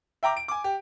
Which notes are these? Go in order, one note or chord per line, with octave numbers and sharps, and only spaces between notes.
E5 G5 A#5 D6
D7
G#5 D6
G4